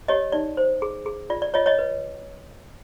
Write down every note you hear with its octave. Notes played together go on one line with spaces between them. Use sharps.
G4 C#5 D#5
D#4 D5
C5
G#4
G#4
F4 D5
D5
F4 C#5 D#5
C#5 D#5
B4